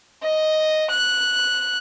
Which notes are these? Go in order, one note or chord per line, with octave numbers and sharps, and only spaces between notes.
D#5
F#6